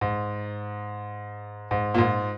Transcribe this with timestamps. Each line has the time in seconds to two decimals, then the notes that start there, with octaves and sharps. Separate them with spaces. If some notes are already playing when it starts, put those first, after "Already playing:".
0.01 G#2
1.71 G#2
1.94 A#2
1.98 G#2